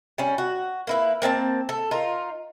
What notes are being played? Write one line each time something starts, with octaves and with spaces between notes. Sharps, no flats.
G3 C#4
F#4
A#3 E4 B4
A#3 C4 D#5 A5
A4
D#4 F4 A#4